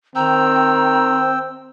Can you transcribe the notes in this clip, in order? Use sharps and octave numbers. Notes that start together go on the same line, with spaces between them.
D#3 C4 G5 A#5 E6